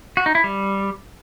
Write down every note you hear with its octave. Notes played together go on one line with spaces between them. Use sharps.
F#4
D#4
E4
G3